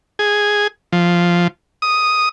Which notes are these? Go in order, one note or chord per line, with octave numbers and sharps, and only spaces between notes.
G#4
F3
D#6